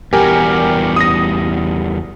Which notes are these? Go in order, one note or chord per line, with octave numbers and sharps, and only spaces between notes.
E2 G3 F#4 G4 A#4 G#5
D#6 A#6